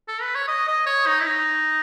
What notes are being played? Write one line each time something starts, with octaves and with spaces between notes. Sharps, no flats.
A4
B4
C#5
D#5
D#5
C#5
D#4
E4
D#4